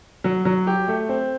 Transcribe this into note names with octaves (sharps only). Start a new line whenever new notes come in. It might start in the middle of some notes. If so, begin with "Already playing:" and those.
F#3
F#3
G4
A3
C4